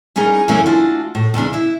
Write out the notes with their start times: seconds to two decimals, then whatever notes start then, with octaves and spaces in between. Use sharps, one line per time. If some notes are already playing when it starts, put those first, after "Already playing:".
0.16 G3 C#4 D#4 G#4 A#4
0.48 F#2 C#3 E3 A3 A#3 C#4
0.66 A3 D4 F4 F#4
1.15 A2
1.34 E2 G2 C#3 D4
1.53 E4 E5